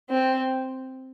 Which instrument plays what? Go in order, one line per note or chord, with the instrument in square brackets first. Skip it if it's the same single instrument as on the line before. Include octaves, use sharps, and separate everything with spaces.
[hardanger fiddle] C4